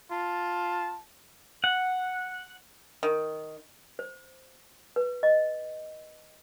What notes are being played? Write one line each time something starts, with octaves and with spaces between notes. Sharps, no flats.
F4 A5
F#5
D#3
C5
B4
D#5